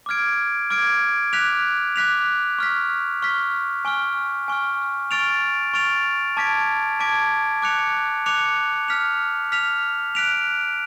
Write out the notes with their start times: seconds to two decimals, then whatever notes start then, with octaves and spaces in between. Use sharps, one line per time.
0.06 D6 F6 G#6 D7
0.70 D6 F6 G#6 D7
1.33 D6 F#6 B6 F7
1.96 D6 F#6 B6 F7
2.58 C#6 F6 B6
3.22 C#6 F6 B6
3.85 G#5 C#6 F6
4.48 G#5 C#6 F6
5.11 C#6 F6 A6 D7 F7
5.74 C#6 F6 A6 D7 F7
6.37 A5 D6 G#6 B6 D7
7.00 A5 D6 G#6 B6 D7
7.62 D6 F#6 C#7 F7
8.26 D6 F#6 C#7 F7
8.88 F6 B6 F7
9.52 F6 B6 F7
10.15 F#6 B6 D7 F7